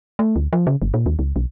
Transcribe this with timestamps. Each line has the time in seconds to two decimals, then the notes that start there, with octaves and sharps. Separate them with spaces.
0.19 A3
0.36 D2
0.53 F3
0.67 C#3
0.82 G1
0.94 A#2
1.06 D#2
1.19 C#2
1.36 B1